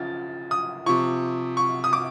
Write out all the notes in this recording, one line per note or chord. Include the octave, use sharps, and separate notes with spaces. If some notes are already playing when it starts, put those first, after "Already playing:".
Already playing: C#3 F3 A6
D#6
C3 F3 C#6
C#6
D#6
D6